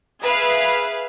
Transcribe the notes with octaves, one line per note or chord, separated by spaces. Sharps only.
G#4 B4 E5 F5